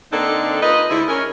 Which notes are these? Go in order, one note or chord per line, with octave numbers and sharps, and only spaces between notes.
D3 A#3 C4 D4 D#4 A4
D#4 F4 B4 D#5
D2 D3 G#3 E4
C#4 A#4